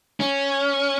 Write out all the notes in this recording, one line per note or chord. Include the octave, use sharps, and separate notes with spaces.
C#4